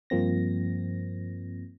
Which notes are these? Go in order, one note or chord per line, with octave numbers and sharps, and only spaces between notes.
G2 F3 A#3 C4 A#6